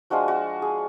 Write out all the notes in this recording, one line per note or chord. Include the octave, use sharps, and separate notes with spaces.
F3 G#3 D4 F4 F#4
F#4
G#4